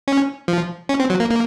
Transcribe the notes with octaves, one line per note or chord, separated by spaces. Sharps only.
C#4
F3
C#4
C4
F#3
A#3
A#3